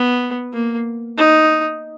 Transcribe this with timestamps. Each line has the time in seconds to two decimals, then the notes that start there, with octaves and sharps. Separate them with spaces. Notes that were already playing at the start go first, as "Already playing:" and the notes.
Already playing: B3
0.53 A#3
1.18 D#4